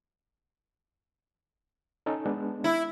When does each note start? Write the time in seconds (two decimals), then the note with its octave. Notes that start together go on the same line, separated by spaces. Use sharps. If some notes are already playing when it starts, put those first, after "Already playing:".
2.06 C#4 D#4 A4
2.26 G#3 B3 D4
2.64 E4